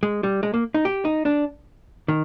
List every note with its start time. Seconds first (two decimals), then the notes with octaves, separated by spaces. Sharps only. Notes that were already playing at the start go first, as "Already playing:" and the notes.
0.03 G#3
0.23 G3
0.43 G#3
0.54 A#3
0.74 D#4
0.85 G4
1.05 D#4
1.25 D4
2.08 D#3